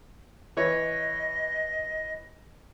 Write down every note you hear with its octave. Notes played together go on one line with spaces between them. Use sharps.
E3 C#5 D#5